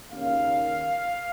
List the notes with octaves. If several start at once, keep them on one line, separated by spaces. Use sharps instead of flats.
D#2 C#3 A#3 C#4 F5